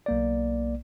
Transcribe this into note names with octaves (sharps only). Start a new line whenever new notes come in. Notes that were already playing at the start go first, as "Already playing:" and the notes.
B1 A#3 D5